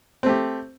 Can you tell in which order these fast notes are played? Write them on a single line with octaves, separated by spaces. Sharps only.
C4 A3 G4